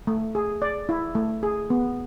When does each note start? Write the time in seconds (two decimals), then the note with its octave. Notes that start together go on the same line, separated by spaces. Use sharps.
0.07 A3
0.35 G#4
0.62 D5
0.89 E4
1.15 A3
1.43 G#4
1.70 B3